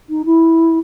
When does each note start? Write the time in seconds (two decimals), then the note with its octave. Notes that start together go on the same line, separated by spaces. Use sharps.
0.09 D#4
0.25 E4